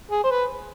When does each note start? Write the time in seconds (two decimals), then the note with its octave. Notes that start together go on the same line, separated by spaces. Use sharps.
0.11 G#4
0.24 C5
0.30 B4